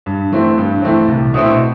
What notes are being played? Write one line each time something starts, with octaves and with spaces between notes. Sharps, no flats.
G2
E3 A3 C4
G2
E3 A3 C4
C2
B2 A3 C4 E4